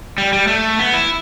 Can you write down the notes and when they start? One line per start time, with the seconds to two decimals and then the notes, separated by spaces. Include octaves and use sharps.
0.18 G3
0.33 G3
0.47 A3
0.79 B3
0.94 E4